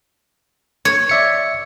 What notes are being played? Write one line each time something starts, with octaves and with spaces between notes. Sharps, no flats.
C#5
D5 E5 C#7